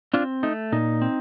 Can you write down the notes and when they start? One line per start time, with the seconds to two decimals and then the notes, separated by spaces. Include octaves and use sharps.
0.13 C4 D4 F4
0.43 A3 D#4
0.72 A#2 D#4
1.02 C4